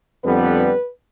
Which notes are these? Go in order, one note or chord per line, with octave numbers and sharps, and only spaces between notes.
F2 D3 G3 B3 B4